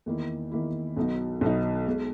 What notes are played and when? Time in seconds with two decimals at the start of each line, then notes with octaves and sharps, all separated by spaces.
0.06 E2 D#3 A#3 E4
0.51 E2 D#3 A#3 E4
0.97 B1 B2 F#3 B3 D#4
1.41 B1 B2 F#3 B3 D#4
1.87 B2 G#3